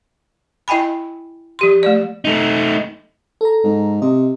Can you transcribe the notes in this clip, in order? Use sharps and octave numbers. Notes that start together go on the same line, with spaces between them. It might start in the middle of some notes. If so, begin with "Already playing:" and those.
E4 D#5 G5 G#5 B5
F3 G4 C6
A3 D5
A3 D#4
A4 A#5
G#2
C3 D#5